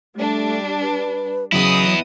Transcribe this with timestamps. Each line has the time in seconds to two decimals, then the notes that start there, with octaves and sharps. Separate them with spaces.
0.15 G3 A3 D4
0.81 B4
1.52 C#3 F#3 B3 E4 D#5 D#6